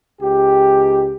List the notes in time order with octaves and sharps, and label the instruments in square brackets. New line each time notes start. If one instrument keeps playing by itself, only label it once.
[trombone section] C#2 G4